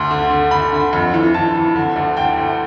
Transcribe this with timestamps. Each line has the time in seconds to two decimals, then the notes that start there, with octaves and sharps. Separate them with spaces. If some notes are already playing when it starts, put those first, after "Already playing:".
Already playing: D2 C6
0.11 D3
0.31 D3
0.51 D3 B5
0.73 D3
0.93 F2
1.14 E3
1.34 E3 A5
1.55 E3
1.76 D3
1.96 D2
2.17 D3 G5
2.37 D2